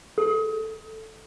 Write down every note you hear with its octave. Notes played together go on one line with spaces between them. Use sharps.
A4